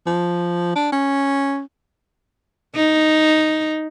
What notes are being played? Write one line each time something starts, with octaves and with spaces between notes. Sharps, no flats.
F3
D4
C#4
D#4